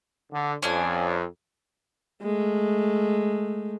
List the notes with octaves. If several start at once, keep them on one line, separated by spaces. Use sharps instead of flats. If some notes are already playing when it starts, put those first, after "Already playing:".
D3
F2 C#4 D4 G#5
G#3 A3